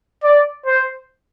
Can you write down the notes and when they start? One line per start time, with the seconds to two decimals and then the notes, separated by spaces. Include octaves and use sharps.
0.24 D5
0.66 C5